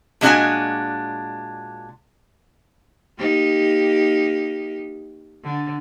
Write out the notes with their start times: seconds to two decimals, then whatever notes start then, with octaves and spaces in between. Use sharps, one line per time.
0.21 A#2 G#3 D4 F#4 G#5
3.18 A#3 D#4 G4
5.44 D3